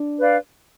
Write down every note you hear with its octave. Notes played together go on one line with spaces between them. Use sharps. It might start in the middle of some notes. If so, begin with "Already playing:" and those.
Already playing: D4
B4 D5 F5